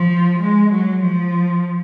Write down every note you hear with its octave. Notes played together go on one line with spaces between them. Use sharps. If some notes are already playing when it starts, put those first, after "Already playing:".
Already playing: F3
G#3
F#3
F3